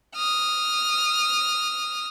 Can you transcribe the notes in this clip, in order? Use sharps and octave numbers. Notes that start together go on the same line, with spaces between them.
D#6 F6